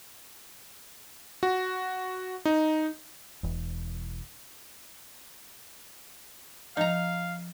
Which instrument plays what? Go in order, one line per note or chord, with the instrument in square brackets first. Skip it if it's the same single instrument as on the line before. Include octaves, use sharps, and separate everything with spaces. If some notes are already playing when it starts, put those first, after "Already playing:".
[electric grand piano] F#4
D#4
[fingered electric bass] E1 E2
[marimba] F3 [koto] D#4 A#5 [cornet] F5